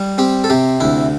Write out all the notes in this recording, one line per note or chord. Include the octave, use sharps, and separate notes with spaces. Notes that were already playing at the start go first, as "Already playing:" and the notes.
Already playing: G3
C4 G4
A4
C3 G4
D2 E4